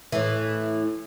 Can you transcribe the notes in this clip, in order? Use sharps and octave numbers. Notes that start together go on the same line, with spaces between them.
A2 E3